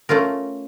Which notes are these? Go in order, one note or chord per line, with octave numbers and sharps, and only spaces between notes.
A3 C#4 F4 A#4